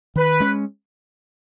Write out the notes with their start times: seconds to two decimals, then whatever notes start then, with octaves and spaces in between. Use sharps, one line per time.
0.16 D#3 B4
0.40 G#3 C#4